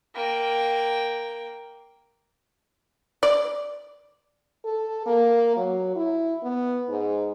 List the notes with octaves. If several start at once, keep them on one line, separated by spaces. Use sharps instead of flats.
A#3 G5
D5
A4
A#3
F#3
E4
B3
G#2